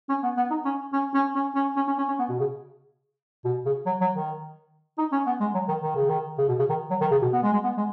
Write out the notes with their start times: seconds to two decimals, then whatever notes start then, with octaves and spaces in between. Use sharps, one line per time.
0.09 C#4
0.23 B3
0.37 B3
0.51 D#4
0.65 C#4
0.93 C#4
1.14 C#4
1.35 C#4
1.56 C#4
1.77 C#4
1.88 C#4
1.98 C#4
2.08 C#4
2.19 B3
2.30 B2
2.40 C#3
3.45 B2
3.66 C#3
3.86 F#3
4.01 F#3
4.14 D#3
4.98 D#4
5.12 C#4
5.26 B3
5.40 G#3
5.54 F#3
5.68 D#3
5.82 D#3
5.96 C#3
6.09 D#3
6.38 C#3
6.48 B2
6.59 C#3
6.69 D#3
6.90 F#3
7.01 D#3
7.11 C#3
7.22 B2
7.33 B3
7.43 G#3
7.53 G#3
7.64 B3
7.77 G#3